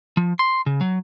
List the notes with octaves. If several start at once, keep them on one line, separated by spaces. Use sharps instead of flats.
F3
C6
C#3
F#3